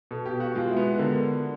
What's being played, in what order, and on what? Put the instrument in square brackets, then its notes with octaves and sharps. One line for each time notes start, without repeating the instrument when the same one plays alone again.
[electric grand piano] B2 [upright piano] A4
[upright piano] G4
[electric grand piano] B2
[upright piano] F#4
[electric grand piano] G#3 [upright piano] F4
[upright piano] E4
[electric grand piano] B3
[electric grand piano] D3 [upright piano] A#4